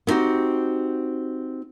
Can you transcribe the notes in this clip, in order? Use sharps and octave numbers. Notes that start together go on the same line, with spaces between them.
B3 C4 D#4 F#4 G4